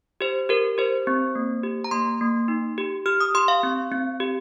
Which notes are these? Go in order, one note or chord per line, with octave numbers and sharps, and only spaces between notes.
G4 C5
G4 A#4
G4 C5
C4
A#3
G4
A#5
A#3 C6
A#3
D#4
G4
G4 F6
D#6
G4 C6
F5
C4
C4
G4